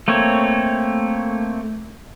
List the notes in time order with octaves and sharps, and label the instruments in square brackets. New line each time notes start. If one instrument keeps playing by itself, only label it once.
[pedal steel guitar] A3 A#3 C4 C#5